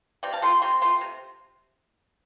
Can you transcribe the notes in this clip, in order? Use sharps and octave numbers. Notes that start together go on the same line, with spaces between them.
C3 D5 G5
F5 A5
A3 F4 G5 C6
C3 G5 C6
A3 F4 G5 C6
C3